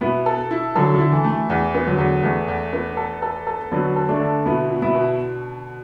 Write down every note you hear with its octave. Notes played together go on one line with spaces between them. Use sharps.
B2 B3 E4
A4
E4
D3 F#3 A4
D3 E4
E3
A3
E3
E2 E3
B3
D3 F#3
E2
E2 E3 A3
E2
B3
A4
A4
A4
D3 F#3 B3
A4
A3 D4
D3
B2 B3 E4
B2
B3 E4
B2